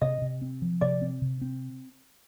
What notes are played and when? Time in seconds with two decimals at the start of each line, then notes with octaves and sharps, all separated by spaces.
0.01 C3 D#5
0.22 C3
0.42 C4
0.62 F3
0.81 C3 D5
1.02 C4
1.22 C3
1.42 C4